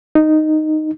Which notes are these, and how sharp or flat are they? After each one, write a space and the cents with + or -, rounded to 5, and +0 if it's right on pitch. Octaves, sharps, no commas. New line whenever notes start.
D#4 -5